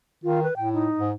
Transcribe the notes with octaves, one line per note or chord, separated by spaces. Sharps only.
D#3 F4
B4
A2 G5
D#4
G#2